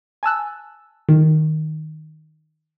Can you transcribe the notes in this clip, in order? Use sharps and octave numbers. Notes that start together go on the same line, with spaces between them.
G#5 A5 E6 F#6
D#3